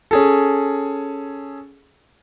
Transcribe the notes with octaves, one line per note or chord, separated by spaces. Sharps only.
C#4 G#4 A4